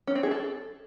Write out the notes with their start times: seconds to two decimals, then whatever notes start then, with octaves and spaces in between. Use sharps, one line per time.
0.07 C#4
0.15 C4
0.23 G#4
0.31 A4